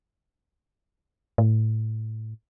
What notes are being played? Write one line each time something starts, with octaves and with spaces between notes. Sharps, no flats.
A2